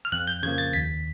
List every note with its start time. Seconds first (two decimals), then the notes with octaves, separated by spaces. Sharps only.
0.05 F6
0.12 F2 F#6
0.27 G6
0.43 C#3 F3 A#3 G#6
0.58 A6
0.73 D#2 B6